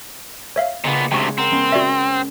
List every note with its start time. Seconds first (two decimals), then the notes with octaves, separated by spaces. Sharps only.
0.56 C#5 E5 F5
0.84 A#2 C#3 B3 D#5 C#7
1.12 D2 C3 G#3 G5 C#6 E7
1.38 C4 A#4 F#5 A#5
1.52 G#3 B3 C#4
1.72 F#4 D5 E5